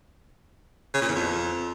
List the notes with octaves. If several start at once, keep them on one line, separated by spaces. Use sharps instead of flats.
C#3
A#2
E2
F2